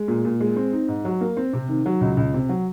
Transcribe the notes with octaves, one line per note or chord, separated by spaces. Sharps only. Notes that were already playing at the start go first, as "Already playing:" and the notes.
Already playing: G#3
A#2
A#2
G#3
C4
D#4
G#2
F#3
A#3
C4
C3
D#3
F#3
C#2
C#2
C3
F#3